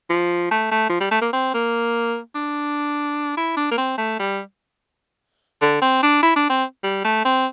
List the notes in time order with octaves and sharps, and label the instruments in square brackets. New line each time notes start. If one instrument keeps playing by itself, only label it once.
[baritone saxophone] F3
A3
A3
F3
G3
A3
A#3
C4
A#3
D4
E4
D4
A#3
C4
A3
G3
D3
C4
D4
E4
D4
C4
G3
A3
C4